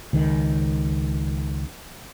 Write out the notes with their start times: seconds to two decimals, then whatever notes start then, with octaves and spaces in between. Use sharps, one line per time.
0.13 C#2 D#3